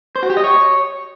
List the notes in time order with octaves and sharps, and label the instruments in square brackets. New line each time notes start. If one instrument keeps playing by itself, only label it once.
[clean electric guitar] C5
F#4
G4
D#5
C#5